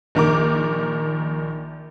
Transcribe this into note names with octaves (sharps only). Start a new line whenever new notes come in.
A#1 D#3 A#4 D6